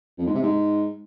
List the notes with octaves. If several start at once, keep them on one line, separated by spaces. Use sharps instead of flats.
F2
G#2
C3
G#2